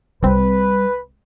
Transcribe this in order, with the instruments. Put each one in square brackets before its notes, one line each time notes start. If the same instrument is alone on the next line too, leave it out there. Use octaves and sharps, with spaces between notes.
[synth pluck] C2 C4 [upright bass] G3 [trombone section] B4